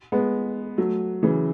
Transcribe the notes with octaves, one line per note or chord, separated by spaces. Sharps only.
G#3 B3
F#3 A3
C#3 E3